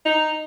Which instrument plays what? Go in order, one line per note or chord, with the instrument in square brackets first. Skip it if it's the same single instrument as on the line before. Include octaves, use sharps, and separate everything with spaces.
[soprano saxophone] D#4